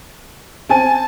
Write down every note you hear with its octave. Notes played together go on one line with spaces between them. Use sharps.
C4 G#5 A5 D#7